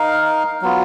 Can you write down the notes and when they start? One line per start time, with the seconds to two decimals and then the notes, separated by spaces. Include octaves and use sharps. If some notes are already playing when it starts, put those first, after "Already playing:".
Already playing: D#4 A#4 F5
0.62 F#3 B3 F4